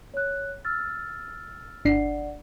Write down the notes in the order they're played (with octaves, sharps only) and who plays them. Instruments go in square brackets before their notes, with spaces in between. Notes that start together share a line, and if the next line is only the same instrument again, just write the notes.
[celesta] C#5 F#6
E6 F6 A6
[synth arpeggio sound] G1 D4 C7 [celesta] D5 F#5